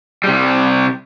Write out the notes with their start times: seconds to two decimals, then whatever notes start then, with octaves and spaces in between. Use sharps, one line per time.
0.24 C3 G3